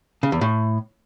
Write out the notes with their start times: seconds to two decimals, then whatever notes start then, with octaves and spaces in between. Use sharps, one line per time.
0.23 C#3
0.32 E2
0.41 A2